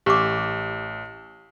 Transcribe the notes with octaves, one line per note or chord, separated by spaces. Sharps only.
A1 G4 F#5 D6